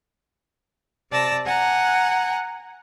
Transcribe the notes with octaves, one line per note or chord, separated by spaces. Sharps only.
C3 D5 A5 E6 A#6
F#5 G#5 A#5 F#6